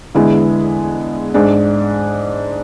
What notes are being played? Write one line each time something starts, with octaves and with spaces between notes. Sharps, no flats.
E2 D3 G#3 B3 E4
G#2 G#3 D4